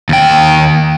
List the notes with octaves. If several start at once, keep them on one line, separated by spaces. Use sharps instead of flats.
D#2 G5